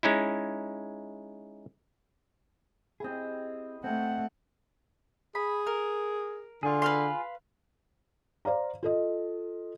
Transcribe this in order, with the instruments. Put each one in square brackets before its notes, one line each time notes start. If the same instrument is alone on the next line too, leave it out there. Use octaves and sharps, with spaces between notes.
[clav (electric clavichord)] G#3 C#4 D#4 E4
[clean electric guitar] C4 G#4 [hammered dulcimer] E4 G4 D#5
[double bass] A3 [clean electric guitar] C4 [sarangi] F#5
[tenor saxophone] G#4 [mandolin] B5
[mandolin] A#4
[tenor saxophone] D3 [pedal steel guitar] F4 G#4
[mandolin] B4 F5 C6
[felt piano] C5 D5 F5 A#5
F4 A4 D#5